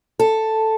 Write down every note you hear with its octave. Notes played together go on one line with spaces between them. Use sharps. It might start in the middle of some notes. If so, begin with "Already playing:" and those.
A4